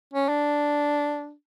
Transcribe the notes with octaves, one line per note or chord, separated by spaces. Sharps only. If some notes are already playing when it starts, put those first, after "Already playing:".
C#4
D4